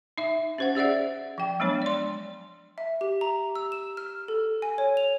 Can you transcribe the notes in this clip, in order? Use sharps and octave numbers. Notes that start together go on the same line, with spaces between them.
D#4 E5
C#4 C5 F#5
C#4 G#4 D5 E5 F#5
F3 G5
F#3 G#3 B3 D4 C#5
D5 C6
E5
G4
A#5
E6
E7
F6
A4
G#5
C#5
F7